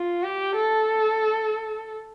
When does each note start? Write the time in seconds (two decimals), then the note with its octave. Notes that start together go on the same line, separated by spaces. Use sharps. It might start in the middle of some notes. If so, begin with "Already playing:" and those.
Already playing: F4
0.23 G4
0.56 A4